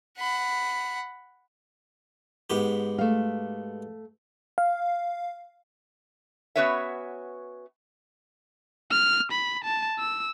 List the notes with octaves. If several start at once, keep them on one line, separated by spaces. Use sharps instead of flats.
F#5 B5
G#2 B3 G4
A3 F5
F5
B3 C#4 F#4 B4 C#5 E5
F6
B5
A5
E6